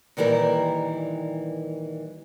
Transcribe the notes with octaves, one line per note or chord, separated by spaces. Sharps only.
A#2 D#3 E3 G3 A#4